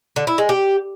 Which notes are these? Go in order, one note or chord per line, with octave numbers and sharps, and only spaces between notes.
D3
E4
G#3
G4